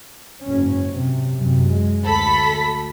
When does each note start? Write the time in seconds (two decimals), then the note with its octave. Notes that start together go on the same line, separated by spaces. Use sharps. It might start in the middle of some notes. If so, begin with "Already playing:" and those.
0.44 F#1 G#2 C#4
0.91 C3
1.37 F#2 C3
1.70 G#3
2.04 D2 A4 B5 B6